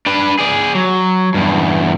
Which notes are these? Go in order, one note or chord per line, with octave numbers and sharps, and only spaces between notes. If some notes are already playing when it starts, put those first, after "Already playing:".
D4 B4
G#4 D5
F#3
E2 G2